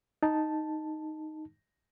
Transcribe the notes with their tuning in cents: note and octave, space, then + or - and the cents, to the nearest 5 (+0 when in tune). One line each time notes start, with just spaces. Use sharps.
D#4 +0 A5 +0